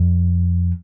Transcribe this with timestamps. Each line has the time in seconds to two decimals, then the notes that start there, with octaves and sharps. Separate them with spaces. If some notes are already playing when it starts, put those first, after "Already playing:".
Already playing: F2